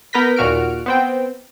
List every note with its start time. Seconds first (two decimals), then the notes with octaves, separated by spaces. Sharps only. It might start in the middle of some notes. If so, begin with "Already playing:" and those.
0.13 B3 A#4 B4 G6 A#6 B6
0.36 D#2 A#2 F#4 F6 D7
0.86 B3 C4 G5